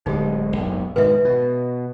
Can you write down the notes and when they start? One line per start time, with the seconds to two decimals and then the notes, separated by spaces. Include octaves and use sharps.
0.06 D1 D3 G#3 D#4 G4
0.56 F#1 B1 G#2
0.96 G#2 B2 D#3 B4 E5
1.25 B2